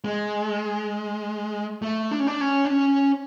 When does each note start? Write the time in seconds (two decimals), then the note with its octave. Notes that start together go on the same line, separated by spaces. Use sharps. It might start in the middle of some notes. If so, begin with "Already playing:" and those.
0.05 G#3
1.82 A3
2.11 D4
2.20 C#4
2.27 D4
2.41 C#4
2.65 D4
2.70 C#4